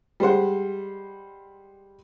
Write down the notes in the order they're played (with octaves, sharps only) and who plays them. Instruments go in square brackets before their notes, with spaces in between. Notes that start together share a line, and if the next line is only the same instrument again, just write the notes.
[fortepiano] G3 G#3 C5 F#5